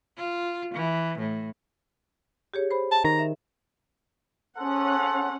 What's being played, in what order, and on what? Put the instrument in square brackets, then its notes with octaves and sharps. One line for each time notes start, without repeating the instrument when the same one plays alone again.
[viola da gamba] F4
E3
A2
[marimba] G4 G#4 C#5
C5 B5
[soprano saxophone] A5
[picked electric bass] D#3 [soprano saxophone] A#5
[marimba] E5
[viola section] C#4 F#5 [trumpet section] G#4 A4 C5